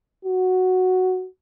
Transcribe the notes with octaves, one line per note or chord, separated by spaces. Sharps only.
F#4